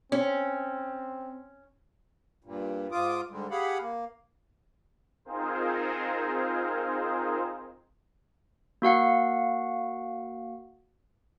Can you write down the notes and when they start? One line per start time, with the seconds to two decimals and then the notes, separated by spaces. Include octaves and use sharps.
0.12 C4 C#4
2.44 G2 A#2
2.92 G#2 F4 D6 D#6
3.31 G#2 D3 G3 G#3
3.51 G4 G#4 F5 F#5 B5
3.80 A#3
5.25 C4 D#4 F4 G#4 A#4 C5
8.82 A#3 F#4 F5 F#5